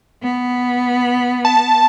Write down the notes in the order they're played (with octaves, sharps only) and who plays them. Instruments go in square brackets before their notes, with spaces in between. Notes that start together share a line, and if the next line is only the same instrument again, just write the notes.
[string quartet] B3
[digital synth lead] A5